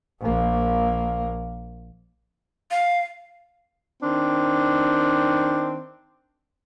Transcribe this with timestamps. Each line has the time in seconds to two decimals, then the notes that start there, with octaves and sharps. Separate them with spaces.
0.21 A#1 A#3
2.71 F5
4.03 D#3 C4 D4